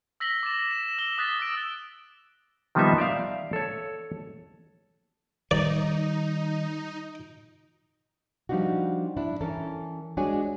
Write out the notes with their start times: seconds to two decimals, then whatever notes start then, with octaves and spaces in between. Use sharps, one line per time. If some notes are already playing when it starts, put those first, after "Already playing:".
0.20 E6 A#6 B6 F#7 G7
0.43 D6 A6 E7
0.71 E7
0.98 E6 E7 G7
1.18 D#6 F#6 A6 B6
1.40 E6 F#6 A6 D7 E7
2.75 D#3 F3 G3 B3 D#4 E5
2.98 D5 E5 F5
3.53 A4 C#5
5.51 D#3 G3 D#4 D5
8.49 F3 G3 D4 D#4 F#4
9.17 D4 E4
9.41 E3 C#4 A4 A#4
10.17 G#3 D4 F#4 C#5 G#5